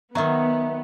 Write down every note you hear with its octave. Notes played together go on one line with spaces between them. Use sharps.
D#3 F#3 B3 E5 A#5